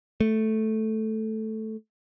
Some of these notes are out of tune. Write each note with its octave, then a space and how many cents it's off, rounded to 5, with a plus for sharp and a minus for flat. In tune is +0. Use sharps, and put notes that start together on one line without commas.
A3 -5